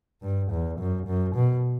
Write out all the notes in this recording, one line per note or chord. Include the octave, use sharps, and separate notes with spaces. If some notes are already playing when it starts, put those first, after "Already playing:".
G2
E2
F#2
F#2
B2